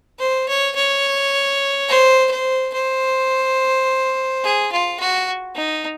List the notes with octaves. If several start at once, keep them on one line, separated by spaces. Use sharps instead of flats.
C5
C#5
C#5
C5
C5
C5
G#4
F4
F#4
D#4